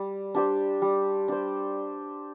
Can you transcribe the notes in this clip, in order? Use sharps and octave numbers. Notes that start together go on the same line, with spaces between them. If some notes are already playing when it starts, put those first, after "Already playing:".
Already playing: G3
D4 G4 C5
G3
D4 G4 C5